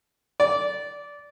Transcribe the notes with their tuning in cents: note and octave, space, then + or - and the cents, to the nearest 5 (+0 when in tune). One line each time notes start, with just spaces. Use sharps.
D5 -15